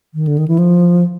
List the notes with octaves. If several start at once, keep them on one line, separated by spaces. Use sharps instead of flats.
D#3
D3
D#3
E3
F3